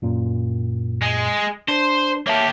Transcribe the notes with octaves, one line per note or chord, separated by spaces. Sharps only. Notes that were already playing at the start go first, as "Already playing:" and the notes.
F#2 A#2
G#3
D4 C5
A#3 G4 C#5 E5 A5